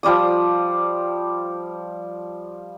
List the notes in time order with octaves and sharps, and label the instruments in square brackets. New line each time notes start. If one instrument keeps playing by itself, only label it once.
[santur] F3 G3 D5 D#6